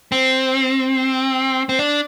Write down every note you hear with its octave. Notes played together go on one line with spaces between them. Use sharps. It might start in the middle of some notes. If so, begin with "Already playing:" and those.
C4
C4
D4